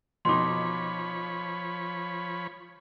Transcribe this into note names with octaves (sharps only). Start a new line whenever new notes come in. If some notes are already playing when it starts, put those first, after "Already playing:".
F2 B2 F3 D#4 C#5 B5 C6 D6